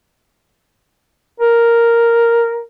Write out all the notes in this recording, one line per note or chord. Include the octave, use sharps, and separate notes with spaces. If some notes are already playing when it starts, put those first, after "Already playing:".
A#4